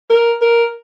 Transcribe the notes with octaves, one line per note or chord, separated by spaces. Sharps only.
A#4
A#4